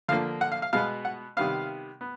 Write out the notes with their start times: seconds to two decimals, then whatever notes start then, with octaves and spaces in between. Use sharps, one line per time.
0.08 D3 F3 A#3 F5
0.41 F#5
0.52 F5
0.62 F5
0.73 B2 G#3 B3 F5
1.05 F#5
1.37 C3 D#3 G3 B3 F5
2.01 B3